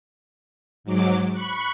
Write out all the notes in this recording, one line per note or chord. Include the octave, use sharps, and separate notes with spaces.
G#2 F#3 D6
B5 C#6 F#6